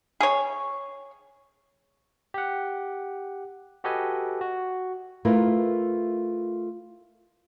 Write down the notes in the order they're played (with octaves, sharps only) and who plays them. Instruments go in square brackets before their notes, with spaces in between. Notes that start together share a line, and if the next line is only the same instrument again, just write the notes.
[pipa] G#4 C#5
[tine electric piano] G4 F#5
F#4 G4 A4 B4 D#5 G#5
F#4
[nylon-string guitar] A3 E4 F4 A#4 B4